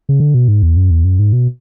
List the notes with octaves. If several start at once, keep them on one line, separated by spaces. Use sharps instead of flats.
C#3
D3
B2
G#2
E2
F#2
E2
F#2
G#2
B2